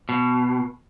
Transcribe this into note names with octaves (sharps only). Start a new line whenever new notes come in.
B2